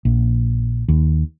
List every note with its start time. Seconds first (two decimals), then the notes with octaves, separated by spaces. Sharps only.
0.05 A#1
0.88 D#2